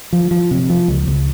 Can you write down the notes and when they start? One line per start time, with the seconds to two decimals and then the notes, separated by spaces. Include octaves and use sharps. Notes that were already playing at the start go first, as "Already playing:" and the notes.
0.13 F3
0.31 F3
0.51 C3
0.69 F3
0.88 C#2
1.08 C#2